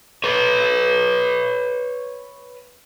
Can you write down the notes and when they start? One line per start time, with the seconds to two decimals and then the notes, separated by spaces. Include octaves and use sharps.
0.24 B4 C#5